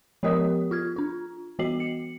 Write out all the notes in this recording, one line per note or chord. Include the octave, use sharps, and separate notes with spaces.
F3 B3 G4 A#4 D#5 D#6
F4 F6 G#6
D4 F4
E3 B3 F#4 D#5 C7 F#7
C#7